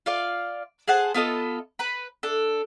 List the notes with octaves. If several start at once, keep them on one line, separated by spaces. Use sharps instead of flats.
F4 D5 F5
G#4 C5 F#5 A5
B3 F4 A4 D#5
B4 B5
D4 A4